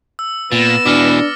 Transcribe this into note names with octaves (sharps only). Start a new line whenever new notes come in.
E6
A#2 B3 A6 A#6 E7
B2 E3 D4 D6 F6 C#7